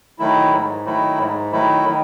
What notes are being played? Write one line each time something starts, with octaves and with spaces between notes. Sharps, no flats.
D#3 F#3 A3 E4
G#2
D#3 F#3 A3 E4
G#2
D#3 F#3 A3 E4
D#3